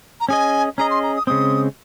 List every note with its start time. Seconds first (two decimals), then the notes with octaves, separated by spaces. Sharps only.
0.20 A#5
0.29 C#4 G#4 D#5 G#5
0.78 C#4 G#4 D#5 A#5
0.91 C6
1.03 A#5
1.15 D#6
1.27 C#3 G#3 C4 D#6